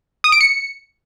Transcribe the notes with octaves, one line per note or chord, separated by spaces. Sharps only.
D#6
D7
C#7